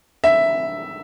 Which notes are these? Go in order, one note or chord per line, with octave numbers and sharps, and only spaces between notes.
E5